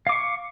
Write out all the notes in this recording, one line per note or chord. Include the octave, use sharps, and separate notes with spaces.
F5 C#6 D6